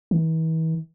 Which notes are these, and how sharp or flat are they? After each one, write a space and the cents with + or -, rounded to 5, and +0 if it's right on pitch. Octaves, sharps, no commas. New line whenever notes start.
E3 -40